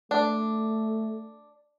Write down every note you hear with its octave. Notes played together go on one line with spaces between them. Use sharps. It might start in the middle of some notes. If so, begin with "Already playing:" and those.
A3 D4